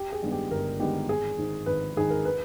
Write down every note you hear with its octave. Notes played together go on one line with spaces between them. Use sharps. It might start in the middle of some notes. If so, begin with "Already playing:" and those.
Already playing: G4
G#4
G2 D#3 G#3 B3
G4
G1 A#4
G2 D#3 G#3 B3 G4
G#1 G#4
G#2 D#3
G#1 B4
G#2 D#3 G#4
A#4
B4